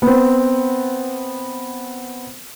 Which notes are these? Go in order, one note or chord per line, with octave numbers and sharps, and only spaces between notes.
B3 C4